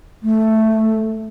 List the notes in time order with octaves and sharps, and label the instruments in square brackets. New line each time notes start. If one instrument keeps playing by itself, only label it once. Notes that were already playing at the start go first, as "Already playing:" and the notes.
[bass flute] A3